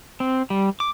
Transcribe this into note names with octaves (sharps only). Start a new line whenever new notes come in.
C4
G3
D6